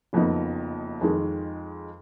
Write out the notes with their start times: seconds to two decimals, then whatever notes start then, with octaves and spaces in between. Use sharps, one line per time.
0.13 F#1 F2 F3 B3 D#4
1.01 F2 D#3 G#3